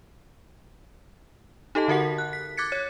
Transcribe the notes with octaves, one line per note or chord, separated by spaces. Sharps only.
D#4 G4 A4 D#5 A5
D3 F#4 A#4 F#5 B6
F#6
B6
D6 F#6 G#6 A6 B6 C#7
C#5